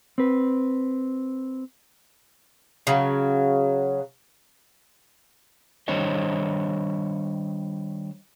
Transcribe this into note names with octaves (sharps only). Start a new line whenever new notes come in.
C4 B4
C#3 F#3
D#3 G3 D4 C5 C#5 D#5